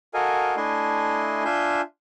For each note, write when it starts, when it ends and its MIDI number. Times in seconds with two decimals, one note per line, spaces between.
0.14 0.56 66
0.14 0.56 69
0.14 0.56 70
0.14 0.56 75
0.14 0.56 77
0.14 0.56 80
0.57 1.44 57
0.57 1.44 62
0.57 1.44 64
0.57 1.44 75
0.57 1.44 80
0.57 1.44 84
1.45 1.81 62
1.45 1.81 65
1.45 1.81 76
1.45 1.81 80
1.45 1.81 84
1.45 1.81 91